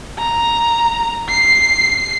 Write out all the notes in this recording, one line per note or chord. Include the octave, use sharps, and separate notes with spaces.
A#5
C7